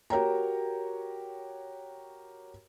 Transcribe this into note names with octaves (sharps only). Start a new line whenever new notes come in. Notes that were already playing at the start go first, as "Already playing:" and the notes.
F#4 G4 A#4 C#5 G5 A#5